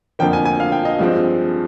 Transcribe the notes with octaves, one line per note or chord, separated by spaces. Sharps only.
F2 D3 F3 A#3 G5
G#5
G#5
F5
G5
D#5
G2 F3 G#3 C4